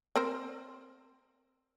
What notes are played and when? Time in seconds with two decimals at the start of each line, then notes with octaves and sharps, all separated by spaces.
0.16 C4 A#4 C5